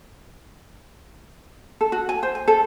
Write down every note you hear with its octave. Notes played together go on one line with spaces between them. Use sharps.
A4
F#4
G#5
C5
G#5
A4